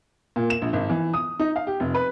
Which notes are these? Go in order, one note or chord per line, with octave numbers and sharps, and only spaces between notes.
A#2
E7
A#1
G#1
E3
D#6
D#4
F5
G4
F1
B4